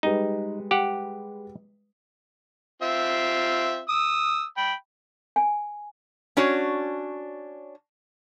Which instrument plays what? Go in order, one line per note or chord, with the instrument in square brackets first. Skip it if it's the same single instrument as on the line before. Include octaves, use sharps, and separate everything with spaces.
[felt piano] G3 G#3 B4 [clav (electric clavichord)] D#4
[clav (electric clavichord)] G4 F#5
[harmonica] C4 F4 E5
D#6 E6
G5 B5
[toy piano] G#5
[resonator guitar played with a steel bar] C#4 D4 F#4 C#5